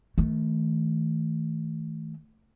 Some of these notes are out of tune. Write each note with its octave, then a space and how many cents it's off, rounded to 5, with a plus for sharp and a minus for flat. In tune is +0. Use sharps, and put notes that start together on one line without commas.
D#3 +45 A3 +0